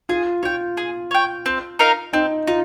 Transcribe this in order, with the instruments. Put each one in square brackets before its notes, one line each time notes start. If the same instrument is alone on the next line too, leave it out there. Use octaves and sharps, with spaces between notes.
[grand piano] F4 [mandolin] G#4
[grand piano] F4 [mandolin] C#5 G5
[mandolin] G#4
C#5 G5
C4
D#4 A#4 F5
[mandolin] C4 [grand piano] D#4
[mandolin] D#4 [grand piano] F4